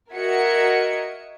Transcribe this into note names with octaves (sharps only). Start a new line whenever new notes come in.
F#4 A#4 D#5 E5 G#6 C#7